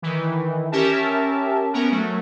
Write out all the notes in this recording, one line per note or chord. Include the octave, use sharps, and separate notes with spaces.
D#3 E3
C#4 G4 A#4 E5 A5
B3 C#4 A#4
F#3 A3